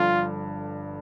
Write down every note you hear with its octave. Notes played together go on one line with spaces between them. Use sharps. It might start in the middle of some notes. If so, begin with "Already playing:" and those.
Already playing: G1 G2 D3 F3 F4